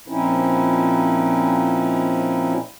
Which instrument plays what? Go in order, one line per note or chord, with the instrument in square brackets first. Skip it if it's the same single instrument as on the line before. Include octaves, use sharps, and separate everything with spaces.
[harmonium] A#2 F3 C4 C#4 D#4 E4